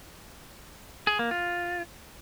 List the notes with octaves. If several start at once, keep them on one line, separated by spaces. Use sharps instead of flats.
G#4
A#3
F4